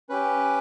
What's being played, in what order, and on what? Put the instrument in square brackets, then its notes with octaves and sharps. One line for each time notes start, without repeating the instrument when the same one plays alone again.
[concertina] C#4 G4 B4